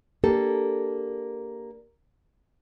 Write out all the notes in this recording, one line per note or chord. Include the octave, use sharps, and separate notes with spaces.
A#3 D4 G4 A4